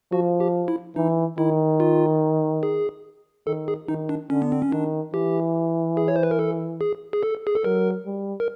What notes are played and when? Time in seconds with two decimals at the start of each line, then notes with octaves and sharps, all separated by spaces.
0.12 F3 F#4
0.40 G4
0.68 E4
0.96 E3 D#4
1.38 D#3 E4
1.80 F4
2.63 G#4
3.47 D#3 A4
3.68 G#4
3.88 D#3 D#4
4.09 D4
4.30 D3 C#4
4.42 B3
4.52 C4
4.62 C#4
4.72 D#3 D4
5.14 E3 G4
5.97 G#4
6.08 C#5
6.16 C5
6.23 B4
6.31 A#4
6.39 A4
6.81 G#4
7.13 G#4
7.23 A4
7.47 G#4
7.55 A4
7.64 F#3 A#4
8.06 G3
8.40 A#4